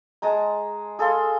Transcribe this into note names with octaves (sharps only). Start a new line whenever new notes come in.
G#3 A5 A#5
G#4 A4 F5 C6